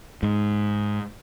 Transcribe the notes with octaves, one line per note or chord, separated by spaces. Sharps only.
G#2